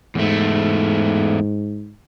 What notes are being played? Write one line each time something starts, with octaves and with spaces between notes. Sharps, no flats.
E2 G#2 A3